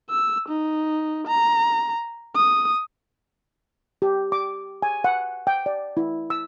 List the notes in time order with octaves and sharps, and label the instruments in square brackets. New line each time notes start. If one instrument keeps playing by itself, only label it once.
[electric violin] E6
D#4
A#5
D#6
[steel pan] G4
D6
G#5
F#5
G5
D5
E4
E6